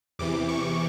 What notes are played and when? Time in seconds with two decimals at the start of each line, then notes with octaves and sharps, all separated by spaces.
0.19 E2 C3 E3 D6
0.49 C#6